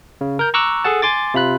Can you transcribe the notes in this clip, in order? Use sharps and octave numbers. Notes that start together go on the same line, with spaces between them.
C#3
A#4 G6
A#5 C#6 D6 E6 F#6
G#4 A4 F#5 A5
G#5 C6 D6 A6
C3 F4 B5 F#6